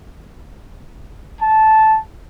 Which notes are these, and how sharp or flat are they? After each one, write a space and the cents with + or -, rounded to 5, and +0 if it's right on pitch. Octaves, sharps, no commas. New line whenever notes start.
A5 -10